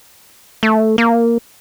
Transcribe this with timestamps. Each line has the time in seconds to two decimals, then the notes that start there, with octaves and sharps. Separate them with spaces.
0.63 A3
0.98 A#3